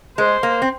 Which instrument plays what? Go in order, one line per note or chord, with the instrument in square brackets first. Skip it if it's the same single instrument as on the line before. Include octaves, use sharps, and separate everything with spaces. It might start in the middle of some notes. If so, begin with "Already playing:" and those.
[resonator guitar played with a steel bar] G#3 [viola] C5
[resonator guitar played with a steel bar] A#3
C4